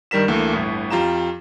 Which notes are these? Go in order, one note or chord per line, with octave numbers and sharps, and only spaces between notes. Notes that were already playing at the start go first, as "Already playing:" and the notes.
G2 D#3 G3 A#4 B6 E7
D2 E3 A3 A#3
G1 A2
F2 F4 G4 A#5 E7